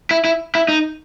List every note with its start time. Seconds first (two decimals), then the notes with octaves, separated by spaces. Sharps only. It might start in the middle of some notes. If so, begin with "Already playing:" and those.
0.11 E4
0.25 E4
0.55 E4
0.69 D#4